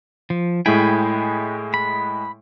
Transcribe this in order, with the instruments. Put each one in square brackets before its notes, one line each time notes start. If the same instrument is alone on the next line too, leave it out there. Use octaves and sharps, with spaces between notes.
[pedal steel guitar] F3
[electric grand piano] A2 G#3 E4 [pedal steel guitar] G5 G#5 B5
[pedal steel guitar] B5